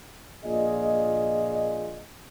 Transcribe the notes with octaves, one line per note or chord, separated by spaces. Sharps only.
A#1 A#2 F4 G#4 D5 D#5